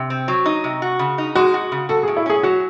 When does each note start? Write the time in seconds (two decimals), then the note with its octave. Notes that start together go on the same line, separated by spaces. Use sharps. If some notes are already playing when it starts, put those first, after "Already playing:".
Already playing: C3
0.10 C4
0.28 F#3
0.46 D#4
0.64 C3
0.82 F#4
0.99 C#3
1.18 D#4
1.35 G#3 F#4
1.54 F#4
1.72 C#3
1.89 F#4 A4
2.03 G#4
2.08 A2
2.17 E4
2.26 C#4 G#4
2.43 F#3 F#4